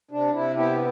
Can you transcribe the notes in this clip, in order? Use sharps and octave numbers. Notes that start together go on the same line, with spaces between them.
C3 D4
C3 E4
B3 E4 G4